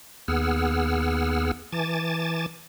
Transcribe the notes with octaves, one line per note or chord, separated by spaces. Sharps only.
D#2 B3 G#4 F#5 E6 F6
E3 G#5 A5 D6 A6